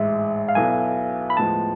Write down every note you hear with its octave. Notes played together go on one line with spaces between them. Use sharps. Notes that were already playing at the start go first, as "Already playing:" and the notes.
Already playing: A1 G#2 G#3 E5
F5
B1 B2 B3 E4 A4 G#5
B5
A2 F3 G#3 B3 A5